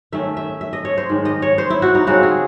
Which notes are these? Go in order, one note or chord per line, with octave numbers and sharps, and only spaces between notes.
D#3 A3 C#4 E5
E5
E5
D#5
C#5
C5
G#2 D#3 G#3
D#5
C#5
C5
E4
F#4
D#4
C#3 G#3 C4 F#4
G#4